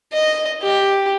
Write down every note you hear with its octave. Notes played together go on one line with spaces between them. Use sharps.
D#5
G4